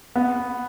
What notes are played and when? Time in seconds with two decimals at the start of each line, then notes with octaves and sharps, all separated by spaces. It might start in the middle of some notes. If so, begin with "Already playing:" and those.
0.16 B3